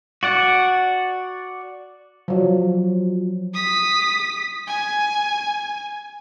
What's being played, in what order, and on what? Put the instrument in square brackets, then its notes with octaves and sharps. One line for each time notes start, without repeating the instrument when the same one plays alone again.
[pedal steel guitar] F#4 D5 F#5
[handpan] F3 F#3
[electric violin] D#6 B6
G#5